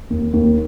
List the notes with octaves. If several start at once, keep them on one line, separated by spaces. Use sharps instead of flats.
D#2
D#2